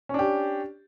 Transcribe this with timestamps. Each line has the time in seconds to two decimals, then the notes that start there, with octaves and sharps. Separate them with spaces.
0.09 C#4
0.14 D4
0.19 G4